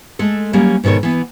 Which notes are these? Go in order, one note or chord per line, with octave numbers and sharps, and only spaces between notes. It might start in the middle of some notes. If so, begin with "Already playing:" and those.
G#3 A3 A4
F#3 G3 A#3 C#4
G#2 B2 D#3 A4 C#5
E3 B3